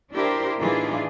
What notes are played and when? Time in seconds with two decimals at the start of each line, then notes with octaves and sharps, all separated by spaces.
0.14 D4 E4 G4 A#4 C5
0.59 A2 E3 D4 D#4 F4 G#4